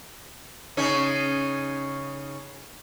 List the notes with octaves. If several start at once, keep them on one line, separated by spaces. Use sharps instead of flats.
C#3 C#4 D#4